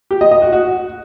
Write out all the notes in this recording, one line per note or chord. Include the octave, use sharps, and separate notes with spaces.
G4
D#5
D#5
F#4
F#4